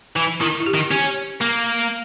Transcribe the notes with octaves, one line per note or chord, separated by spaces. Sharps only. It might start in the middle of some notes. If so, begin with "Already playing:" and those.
E3
D#3 E4
E4
G4
D#3
C#4 G4
A#3